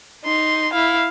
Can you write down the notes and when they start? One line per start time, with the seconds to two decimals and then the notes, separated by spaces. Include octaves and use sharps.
0.25 D#4 C6
0.73 E4 F5